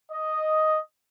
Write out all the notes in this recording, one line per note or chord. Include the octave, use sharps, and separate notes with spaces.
D#5